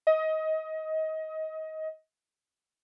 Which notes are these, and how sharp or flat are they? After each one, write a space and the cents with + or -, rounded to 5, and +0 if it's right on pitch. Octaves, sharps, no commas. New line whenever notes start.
D#5 +20